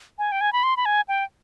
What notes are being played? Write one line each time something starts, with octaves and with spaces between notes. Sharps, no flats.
G#5
G5
G#5
B5
C6
B5
G#5
G5